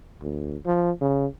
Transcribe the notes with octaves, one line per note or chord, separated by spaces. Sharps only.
D2
F3
C#3